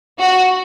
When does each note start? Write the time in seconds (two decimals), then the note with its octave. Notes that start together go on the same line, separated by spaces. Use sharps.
0.20 F#4